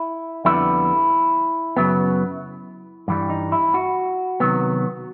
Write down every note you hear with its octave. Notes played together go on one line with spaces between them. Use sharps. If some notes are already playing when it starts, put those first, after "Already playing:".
Already playing: E4
F2 D3 G3 B3 E4
F#2 C#3 F#3 B3
G2 E3 G3
D#4
E4
F#4
C3 D#3 F#3 B3